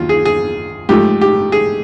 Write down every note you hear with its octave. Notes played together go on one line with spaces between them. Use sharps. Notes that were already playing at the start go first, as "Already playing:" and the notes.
Already playing: D#2 F#3 F4
G#4
G#4
G#2 F3 A3 G4
G4
G#4